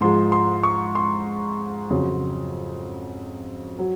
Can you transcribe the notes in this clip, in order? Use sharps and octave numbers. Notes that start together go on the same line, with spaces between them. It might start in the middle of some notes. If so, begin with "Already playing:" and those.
G#2 F3 G#3 C6
C6
C#6
C6
F2 C#3 F#3
F#3